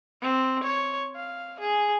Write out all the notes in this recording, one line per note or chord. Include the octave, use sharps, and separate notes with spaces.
C4
C#5
F5
G#4